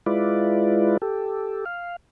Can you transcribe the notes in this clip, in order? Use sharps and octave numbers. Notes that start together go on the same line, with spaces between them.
G#3 E4 F4 B4 D5
G4 A4
F5